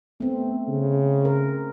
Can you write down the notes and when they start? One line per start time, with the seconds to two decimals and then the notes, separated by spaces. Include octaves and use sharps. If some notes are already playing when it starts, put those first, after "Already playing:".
0.20 A3 B3 C4
0.68 C#3
1.25 A#4